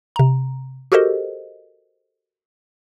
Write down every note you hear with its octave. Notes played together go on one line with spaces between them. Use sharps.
C3 A#5
F#4 G4 A4 A#4 C5 D#5